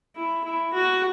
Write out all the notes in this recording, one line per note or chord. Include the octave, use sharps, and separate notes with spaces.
E4
E4
F#4